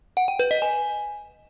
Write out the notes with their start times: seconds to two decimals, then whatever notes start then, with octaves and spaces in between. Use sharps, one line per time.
0.17 F#5
0.28 G5
0.39 B4
0.51 D#5
0.62 G#5